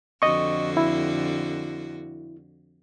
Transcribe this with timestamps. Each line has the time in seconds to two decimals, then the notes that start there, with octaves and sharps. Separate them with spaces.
0.22 F2 D3 F#4 D#5 C#6
0.77 E4